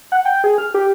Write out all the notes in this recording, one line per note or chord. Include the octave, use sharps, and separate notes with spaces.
F#5
G5
G#4
F6
G4